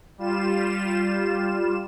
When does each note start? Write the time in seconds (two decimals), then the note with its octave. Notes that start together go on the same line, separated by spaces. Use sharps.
0.18 G3 F4 E7